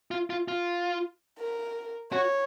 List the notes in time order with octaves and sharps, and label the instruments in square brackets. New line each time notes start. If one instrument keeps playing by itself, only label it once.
[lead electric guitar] F4
F4
F4
[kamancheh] A#4
[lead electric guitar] F#4 [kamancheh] C#5